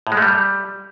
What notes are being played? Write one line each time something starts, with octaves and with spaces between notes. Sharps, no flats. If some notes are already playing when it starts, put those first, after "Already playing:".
A2
G#3
A3
G3